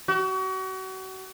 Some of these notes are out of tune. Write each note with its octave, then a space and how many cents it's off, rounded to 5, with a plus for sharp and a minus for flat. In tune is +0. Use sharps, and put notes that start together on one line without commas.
F#4 +35